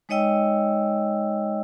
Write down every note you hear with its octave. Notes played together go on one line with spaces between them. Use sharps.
G#3 D#4 C#5 D#5 G5 E6